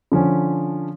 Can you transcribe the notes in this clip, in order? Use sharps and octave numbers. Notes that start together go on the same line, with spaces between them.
D3 F3 C#4